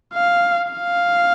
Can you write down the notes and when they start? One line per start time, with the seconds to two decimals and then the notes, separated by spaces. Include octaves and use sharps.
0.14 F5
0.72 F5